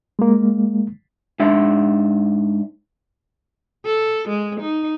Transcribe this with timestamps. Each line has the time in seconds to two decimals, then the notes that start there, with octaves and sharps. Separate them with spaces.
0.19 G#3 A#3
1.40 G#2 D4 E5
3.86 A4
4.29 G#3
4.61 D#4